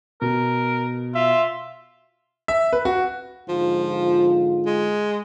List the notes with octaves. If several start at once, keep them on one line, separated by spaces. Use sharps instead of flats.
B2 A#4
F4 E5
E5
B4
F#4
G#2 D3 F3 F4
G#3